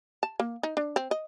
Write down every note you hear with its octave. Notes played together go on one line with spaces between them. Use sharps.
A5
A#3
D#4
D4
C4
D#5